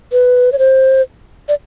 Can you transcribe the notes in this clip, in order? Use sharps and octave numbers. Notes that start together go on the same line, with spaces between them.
B4
C#5
C5
D5